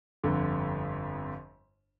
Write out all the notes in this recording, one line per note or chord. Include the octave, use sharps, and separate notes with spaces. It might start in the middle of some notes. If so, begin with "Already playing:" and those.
G1 F2 D3